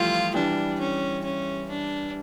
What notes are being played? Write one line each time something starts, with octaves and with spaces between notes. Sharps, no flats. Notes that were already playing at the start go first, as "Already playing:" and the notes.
Already playing: E3 F3 G3 A3 F4
E3 G3 D4
C#4
C#4
D4